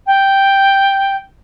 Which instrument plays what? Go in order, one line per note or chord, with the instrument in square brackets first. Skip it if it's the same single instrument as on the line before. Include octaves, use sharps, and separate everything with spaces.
[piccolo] G5